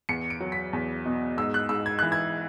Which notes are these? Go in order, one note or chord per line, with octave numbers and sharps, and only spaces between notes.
E2 C#7
D7
F#3
B6
E2
B2
G#2 E6
F#6
G#2 E6
G#6
E3 F#6
G#6